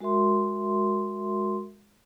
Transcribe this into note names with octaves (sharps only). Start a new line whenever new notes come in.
G#3 F#4 A#4 E5 C6